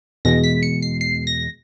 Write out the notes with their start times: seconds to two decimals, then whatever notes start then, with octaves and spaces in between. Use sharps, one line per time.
0.25 E2 B2 G#3 A#6
0.43 B6
0.63 C#7
0.82 C7
1.01 C7
1.27 A#6